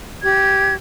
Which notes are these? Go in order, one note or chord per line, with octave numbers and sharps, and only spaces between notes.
G4 G#6